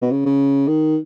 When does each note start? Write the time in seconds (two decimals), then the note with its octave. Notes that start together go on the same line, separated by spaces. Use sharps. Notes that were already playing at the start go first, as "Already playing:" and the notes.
0.02 B2
0.11 C#3
0.26 C#3
0.68 D#3